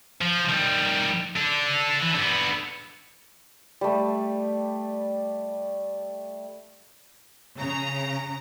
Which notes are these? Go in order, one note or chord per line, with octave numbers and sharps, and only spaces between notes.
F3
D#3 G3
D4 A4
E3
D3 B3
G3 A3
C#3 A#5